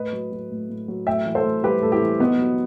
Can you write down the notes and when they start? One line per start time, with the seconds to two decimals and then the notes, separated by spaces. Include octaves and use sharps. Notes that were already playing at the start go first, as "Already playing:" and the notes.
Already playing: A2 B4 D#5
0.13 F#3
0.32 F#3
0.51 A2
0.69 A2
0.88 F#3
1.07 A2 E5 G5
1.26 E3
1.35 A4 C5
1.45 A2
1.63 G3 G4 B4
1.82 A2 A4
1.92 E4 G4
2.01 E3
2.20 B2 B3 D#4
2.39 F#3